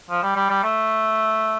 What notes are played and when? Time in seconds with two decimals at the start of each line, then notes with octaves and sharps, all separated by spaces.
0.10 F3
0.23 G3
0.36 G3
0.50 G3
0.63 A3